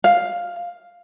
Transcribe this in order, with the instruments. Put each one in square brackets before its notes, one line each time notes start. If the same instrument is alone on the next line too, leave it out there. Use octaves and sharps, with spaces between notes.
[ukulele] F5